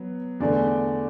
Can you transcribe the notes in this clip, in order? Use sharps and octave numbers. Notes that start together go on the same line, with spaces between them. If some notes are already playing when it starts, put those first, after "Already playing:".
Already playing: F#3 B3
E2 D3 A3 D5